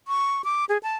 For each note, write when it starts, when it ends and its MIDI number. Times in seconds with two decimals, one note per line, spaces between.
0.08 0.42 85
0.44 0.65 86
0.69 0.78 68
0.83 0.96 81